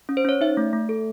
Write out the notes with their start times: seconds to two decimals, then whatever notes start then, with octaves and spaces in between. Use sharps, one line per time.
0.09 C#4
0.17 C5
0.25 C#4 C#5
0.41 D#4 E5
0.57 A3
0.73 A3
0.89 A4